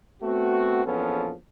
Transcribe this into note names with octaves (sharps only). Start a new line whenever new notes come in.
A3 B3 C4 F#4
A#1 E2 F3 B3 C#4 A4